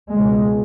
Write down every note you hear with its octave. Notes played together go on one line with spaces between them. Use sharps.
C#2 B2 G#3